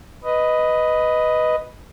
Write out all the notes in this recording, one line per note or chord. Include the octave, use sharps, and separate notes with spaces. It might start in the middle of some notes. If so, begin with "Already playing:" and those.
B4 D#5